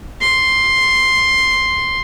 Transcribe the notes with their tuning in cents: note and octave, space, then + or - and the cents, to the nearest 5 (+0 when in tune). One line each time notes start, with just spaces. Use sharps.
C6 +5